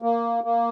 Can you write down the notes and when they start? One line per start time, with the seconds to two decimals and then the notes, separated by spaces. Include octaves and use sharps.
0.02 A#3
0.44 A#3